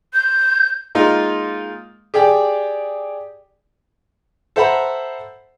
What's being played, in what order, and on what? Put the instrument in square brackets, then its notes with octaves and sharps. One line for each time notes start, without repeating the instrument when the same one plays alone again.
[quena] G6
[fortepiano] G#3 A#3 D#4 F4
G4 G#4 D5 G5
A4 C5 E5 F#5 A#5 B5